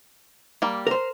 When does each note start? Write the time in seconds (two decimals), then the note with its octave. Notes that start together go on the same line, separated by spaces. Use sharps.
0.62 G3 A#3
0.87 A#4 C5